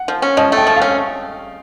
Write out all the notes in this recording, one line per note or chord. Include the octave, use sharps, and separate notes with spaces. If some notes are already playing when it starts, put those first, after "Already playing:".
Already playing: F#5
F3
C#4
F3 D#5
A3
G5
F3
F5
C#4